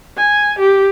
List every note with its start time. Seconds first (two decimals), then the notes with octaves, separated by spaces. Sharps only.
0.18 G#5
0.59 G4